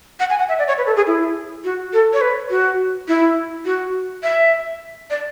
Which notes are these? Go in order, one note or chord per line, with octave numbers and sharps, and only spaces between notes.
F#5
G#5
F#5
E5
D5
C#5
B4
A4
G#4
E4
F#4
A4
C#5
B4
F#4
E4
F#4
E5
D5